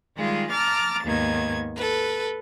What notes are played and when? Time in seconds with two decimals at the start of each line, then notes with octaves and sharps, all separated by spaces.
0.16 D#3 G3 G#3 F4 G#4
0.51 A5 A#5 D6 F6 A6
1.04 D#2 G#2 D#3 B3 G#6
1.76 A4 B4